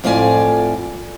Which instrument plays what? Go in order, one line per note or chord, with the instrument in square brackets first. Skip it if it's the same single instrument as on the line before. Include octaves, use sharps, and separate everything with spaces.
[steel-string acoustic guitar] F2 A2 F4 D5 G#5